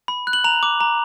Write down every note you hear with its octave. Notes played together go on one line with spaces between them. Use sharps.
B5
F#6
F#7
A#5 F7
D6
A#5